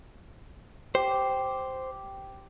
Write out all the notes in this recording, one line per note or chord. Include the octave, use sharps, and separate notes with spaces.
G4 C5